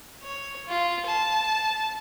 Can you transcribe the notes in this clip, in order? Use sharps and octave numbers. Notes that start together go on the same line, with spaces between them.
C#5
F4
A5